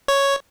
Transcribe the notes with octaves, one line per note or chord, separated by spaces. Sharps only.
C#5